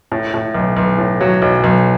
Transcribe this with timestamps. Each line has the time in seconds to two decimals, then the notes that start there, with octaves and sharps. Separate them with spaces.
0.12 A2
0.34 A2
0.54 B1
0.77 B1
0.98 A2
1.21 F#3
1.42 B1
1.64 B1